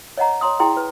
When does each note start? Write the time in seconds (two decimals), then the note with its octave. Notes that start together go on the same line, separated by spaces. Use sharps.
0.17 C#5 D#5 F#5 A#5
0.41 C#5 A#5 C6 D#6
0.60 E4 G#4 G5 A#5 C6
0.77 B4